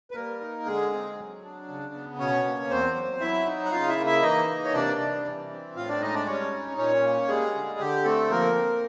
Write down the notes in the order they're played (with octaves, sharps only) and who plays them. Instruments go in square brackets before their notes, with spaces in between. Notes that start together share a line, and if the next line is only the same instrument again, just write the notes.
[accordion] B4
G3 A#3 A#4
D#4
D3 G#3 G#4
C4
F#3
D4
C#3
B3
B2 C#4 C#5
A#3
E2 C4 C5
F#3
F#3 E4 E5
D#4
F#5
C#3 F4 F5
E4 E5
A#3
E4 E5
E3 D#4 D#5
A#3
C#5
C3 D4 D5
G3
E3
C4
A2 F4 F5
D4 D5
G#3 D#4 D#5
D4 D5
G3 C#4 C#5
D#4
A#2 C#4 C#5
A#3
G3 G#3 G#4
D3
D3 G4
A3 C4 A4
F3 A#3 A#4
C4